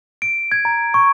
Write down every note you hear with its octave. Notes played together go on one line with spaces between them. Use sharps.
D7
G#6
A#5
C#6